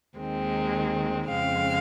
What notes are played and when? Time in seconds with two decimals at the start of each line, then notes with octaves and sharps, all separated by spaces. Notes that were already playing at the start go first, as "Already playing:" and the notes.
0.17 D#2 D#3 G#3 C4
1.29 F2 C#3 G#3 C4 F5